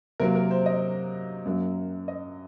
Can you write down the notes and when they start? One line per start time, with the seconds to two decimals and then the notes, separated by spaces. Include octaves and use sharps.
0.20 C3 F#3 A#3 A#4
0.35 A#4
0.51 C5
0.66 D#5
1.45 F#2 F#3 A#3
2.08 D#5